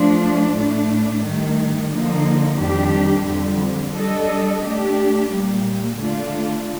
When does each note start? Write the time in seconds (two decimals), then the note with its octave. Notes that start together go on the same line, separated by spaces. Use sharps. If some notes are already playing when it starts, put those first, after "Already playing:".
Already playing: F3 A3 D4
0.55 A2 A3 D4
1.22 G2 D#3 A3
1.90 D3 F3 A#3 D#4
2.58 F2 D#3 G3 D4 G4
3.26 F2 D3 G3
3.94 G3 D4 A4 D#5
4.62 A3 D4 G4
5.29 A#2 G3 A#3
5.97 D3 A3 D4 F4